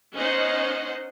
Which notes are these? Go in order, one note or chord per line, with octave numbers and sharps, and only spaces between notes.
B3 C#4 D#4 C5 D#5 F#5